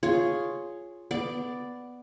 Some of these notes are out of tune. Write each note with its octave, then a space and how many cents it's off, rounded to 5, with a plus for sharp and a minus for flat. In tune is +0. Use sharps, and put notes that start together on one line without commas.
F4 +0 G#4 +0 C#5 +0
B3 +0 D5 +0